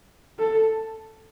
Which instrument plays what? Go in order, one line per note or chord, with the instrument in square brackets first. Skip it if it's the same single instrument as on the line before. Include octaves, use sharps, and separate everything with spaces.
[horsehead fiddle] A4